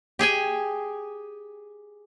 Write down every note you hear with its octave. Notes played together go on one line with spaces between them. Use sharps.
G4 G#4 G5 G#5